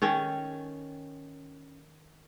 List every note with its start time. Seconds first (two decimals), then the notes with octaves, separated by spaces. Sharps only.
0.02 D#3 C#4 A4